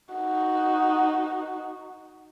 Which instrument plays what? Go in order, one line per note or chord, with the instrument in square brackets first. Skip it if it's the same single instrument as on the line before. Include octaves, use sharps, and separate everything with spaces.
[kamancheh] D#4 F#4